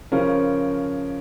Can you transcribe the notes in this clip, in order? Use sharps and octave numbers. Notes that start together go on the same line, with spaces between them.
C#3 F3 C#4 A#4